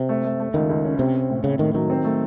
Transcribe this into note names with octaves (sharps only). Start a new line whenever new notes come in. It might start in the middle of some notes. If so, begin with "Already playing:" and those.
Already playing: C3
A3
A3
A3
C#2 D#3
C#2
C#4
C3 C4
C4
A2
A2 C#3
A2 D#3
D#3 F#3
C4
A3